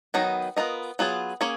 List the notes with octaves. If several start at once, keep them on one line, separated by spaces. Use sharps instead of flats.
D#3 F#3 B3 D#4
B3 F4 A#4 D#5
F#3 B3 F4 G#4
A#3 C#4 G#4 C#5